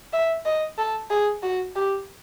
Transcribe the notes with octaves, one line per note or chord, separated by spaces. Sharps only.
E5
D#5
A4
G#4
F#4
G4